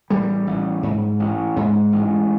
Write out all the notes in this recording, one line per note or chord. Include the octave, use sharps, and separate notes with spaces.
A1 G3
A1
G#2
A1
G#2 G#3
A1